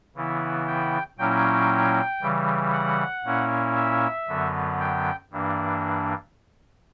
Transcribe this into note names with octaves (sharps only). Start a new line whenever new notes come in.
C#3 E3 B3 E4
G5
A#2 F#3 A#3 C#4 E4 G5
C#3 E3 G3
F#5
A#2 A#3 C#4 E4
E5
F#2 D3 F#3 B3
G5
G2 E3 A#3 D4